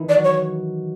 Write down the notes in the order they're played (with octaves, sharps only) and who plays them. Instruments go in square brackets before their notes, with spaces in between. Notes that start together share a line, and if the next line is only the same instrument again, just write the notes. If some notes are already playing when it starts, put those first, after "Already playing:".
Already playing: [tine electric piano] D#3 E3 D#4 E4
[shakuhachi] D5
[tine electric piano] F#3 F#4
[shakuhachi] C#5